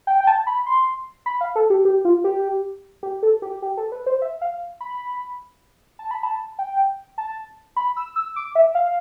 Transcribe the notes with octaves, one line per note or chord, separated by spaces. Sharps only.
G5
G5
A5
B5
C6
B5
F5
A4
G4
G4
F4
G4
G4
A4
G4
G4
A4
B4
C5
E5
F5
B5
A5
B5
A5
G5
A5
B5
E6
E6
D6
E5
F5